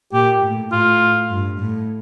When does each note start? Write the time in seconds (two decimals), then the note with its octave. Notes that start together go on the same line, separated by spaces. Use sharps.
0.13 A#2 G4
0.43 A2
0.72 A2 F4
1.30 G2
1.60 A2